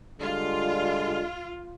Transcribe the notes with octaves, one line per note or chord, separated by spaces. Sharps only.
D3 G3 G#3 F4